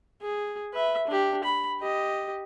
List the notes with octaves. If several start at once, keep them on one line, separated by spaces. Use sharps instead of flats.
G#4
B4 E5
D4 G4
B5
G4 D#5